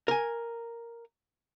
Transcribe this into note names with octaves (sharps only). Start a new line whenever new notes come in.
A#4 G#5